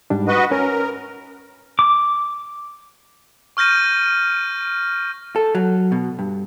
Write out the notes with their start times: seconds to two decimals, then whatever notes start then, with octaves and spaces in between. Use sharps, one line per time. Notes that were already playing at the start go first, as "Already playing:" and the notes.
0.10 G#2 G3 D4
0.28 F#4 B4 D#5
0.51 C#4 A#4 B4
1.79 D6
3.57 C#6 F6 G6 A#6 D#7
5.36 A4
5.55 F#3
5.92 B2
6.19 G2